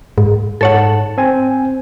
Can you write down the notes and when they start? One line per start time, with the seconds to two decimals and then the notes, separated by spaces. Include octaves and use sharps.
0.18 G#2
0.61 G#2 A4 C#5 F#5 A5
1.18 C4 G#5